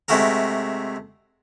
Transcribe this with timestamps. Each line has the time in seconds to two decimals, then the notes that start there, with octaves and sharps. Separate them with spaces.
0.08 C3 G#3 A3 F#4 A4 A#4